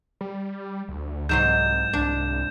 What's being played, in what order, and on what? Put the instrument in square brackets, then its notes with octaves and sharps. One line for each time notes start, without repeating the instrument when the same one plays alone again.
[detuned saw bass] G3
D2
[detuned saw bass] C2 [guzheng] G#2 F#3 C6 [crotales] G6 E7
[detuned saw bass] C2 [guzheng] D4